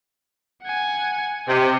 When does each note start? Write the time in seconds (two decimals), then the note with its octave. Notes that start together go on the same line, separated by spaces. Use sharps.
0.63 F#5 G#5
1.48 C3 D#5